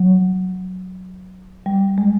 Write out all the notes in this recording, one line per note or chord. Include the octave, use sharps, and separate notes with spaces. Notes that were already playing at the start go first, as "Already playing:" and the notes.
Already playing: F#3
G3
G#3